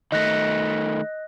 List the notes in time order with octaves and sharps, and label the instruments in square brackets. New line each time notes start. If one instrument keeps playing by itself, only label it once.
[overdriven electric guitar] D#3 A3 [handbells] D#5 F#6 A#6